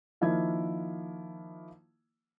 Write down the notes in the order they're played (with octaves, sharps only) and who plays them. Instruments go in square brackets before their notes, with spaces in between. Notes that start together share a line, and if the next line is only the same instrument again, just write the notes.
[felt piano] D#3 F3 A#3 E4 G#6